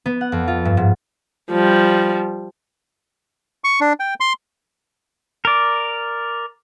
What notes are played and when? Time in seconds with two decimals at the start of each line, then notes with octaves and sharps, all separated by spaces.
0.06 B3
0.21 F#5
0.32 F2
0.48 F4
0.65 G2
0.77 G#2
1.51 F3 G3
3.64 C#6
3.81 D4
4.00 G5
4.20 C6
5.45 A#4 D5